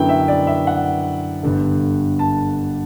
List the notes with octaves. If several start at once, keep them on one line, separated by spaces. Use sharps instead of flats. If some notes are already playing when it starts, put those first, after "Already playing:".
Already playing: F#2 D3 F#3 B3 E4 G5
E5
D5
E5
F#5
G1 G2 D3
A5